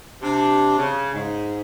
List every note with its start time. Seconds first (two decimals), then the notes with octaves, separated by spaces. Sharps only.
0.21 C3 D4
0.77 C#3
1.13 G#2